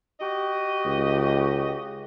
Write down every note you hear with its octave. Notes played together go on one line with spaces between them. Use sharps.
F#4 G4 D#5
C#2